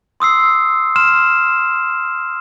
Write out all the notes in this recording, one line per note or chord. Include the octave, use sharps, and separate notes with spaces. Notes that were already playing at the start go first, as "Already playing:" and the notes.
C6 D#6 E6 C7
C6 F6 E7